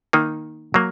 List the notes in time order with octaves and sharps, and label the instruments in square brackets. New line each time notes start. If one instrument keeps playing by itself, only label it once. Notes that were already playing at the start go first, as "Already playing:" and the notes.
[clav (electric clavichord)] D#3 A#3 D#4
F#3 A#3